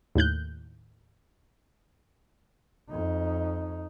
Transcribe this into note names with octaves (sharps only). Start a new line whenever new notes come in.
D#2 A2 F#6 G6
F2 D#4